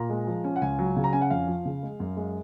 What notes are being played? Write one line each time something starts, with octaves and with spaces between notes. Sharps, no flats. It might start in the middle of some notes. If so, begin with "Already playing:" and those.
Already playing: A#2 A#5
G#3
F3
C#4
F#5
C#2 G#5
F#3
C#3
A#5
C#4 G#5
F#5
F2 F5
F3
C#3
G#3
F#2
G#3